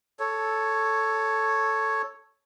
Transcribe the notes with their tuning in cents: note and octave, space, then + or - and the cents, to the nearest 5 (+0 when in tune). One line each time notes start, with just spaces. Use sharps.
A4 +0 C#5 +0